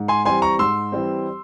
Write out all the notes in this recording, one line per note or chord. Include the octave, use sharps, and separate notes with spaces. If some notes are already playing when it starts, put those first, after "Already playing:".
Already playing: G#2
G#5 C6
E3 G3 C4 G#5 C6
A#5 C#6
G#2 C6 E6
E3 G3 C4